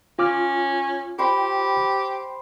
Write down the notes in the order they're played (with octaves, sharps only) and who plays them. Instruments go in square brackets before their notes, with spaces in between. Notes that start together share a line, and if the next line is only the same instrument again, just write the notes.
[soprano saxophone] C#4 [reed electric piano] F4 D6 F6
[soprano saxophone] G4 [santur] C5 G5 B5